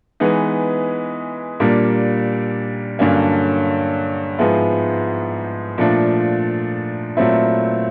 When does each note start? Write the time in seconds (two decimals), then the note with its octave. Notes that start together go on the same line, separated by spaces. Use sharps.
0.20 E3 G#3 B3 D#4
1.60 A#2 G3 A#3 D4
2.99 G2 D3 F#3 A#3 C#4
4.38 G#2 F3 G#3 B3 E4
5.78 A#2 F3 A3 D4
7.17 A#2 F#3 A3 C4 E4